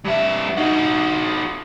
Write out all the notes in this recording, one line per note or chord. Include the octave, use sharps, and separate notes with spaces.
G2 E5
D#4 F#4